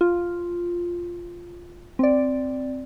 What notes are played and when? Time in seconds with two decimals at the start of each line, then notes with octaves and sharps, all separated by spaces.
0.01 F4
1.99 C4 D5